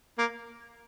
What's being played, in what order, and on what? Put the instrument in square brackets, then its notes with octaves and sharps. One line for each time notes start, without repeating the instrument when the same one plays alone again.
[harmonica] A#3